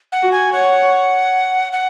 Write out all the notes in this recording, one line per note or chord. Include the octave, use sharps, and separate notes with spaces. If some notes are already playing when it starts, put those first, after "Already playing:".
F#5
F#4
G#5
C#5 F#5
F#5